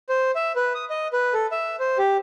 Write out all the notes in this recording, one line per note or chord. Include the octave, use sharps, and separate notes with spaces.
C5
E5
B4
D#6
D#5
B4
A4
E5
C5
G4